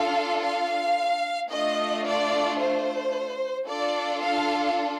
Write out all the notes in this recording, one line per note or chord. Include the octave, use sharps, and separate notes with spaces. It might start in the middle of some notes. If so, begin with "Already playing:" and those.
Already playing: D4 F4 A4 F5
F5
A3 D4 F4 D#5
D5
C5
D4 F4 A4 D5
F5